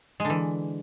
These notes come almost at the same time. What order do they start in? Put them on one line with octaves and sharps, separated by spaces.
G#3 D3 E3